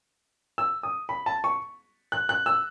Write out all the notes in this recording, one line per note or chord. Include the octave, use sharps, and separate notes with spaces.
E6
D#6
B5
A5
C#6
F#6
F#6
E6